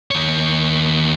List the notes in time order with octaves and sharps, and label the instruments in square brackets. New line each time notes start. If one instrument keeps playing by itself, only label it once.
[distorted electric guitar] D#2 C#5